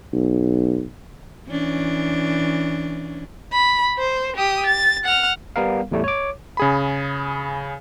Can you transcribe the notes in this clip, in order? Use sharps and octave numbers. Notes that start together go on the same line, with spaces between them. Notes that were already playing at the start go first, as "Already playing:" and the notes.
B1
E3 C#4 D4
B5
C5
G4 D#6
A6
F#5 F6
G3 B3 A#4 F5
E2 A2 G3 A3
C#5 D6
C#3 G#4 B5